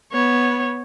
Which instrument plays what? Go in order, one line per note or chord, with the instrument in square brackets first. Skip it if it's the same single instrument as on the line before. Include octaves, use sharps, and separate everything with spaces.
[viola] B3 C#5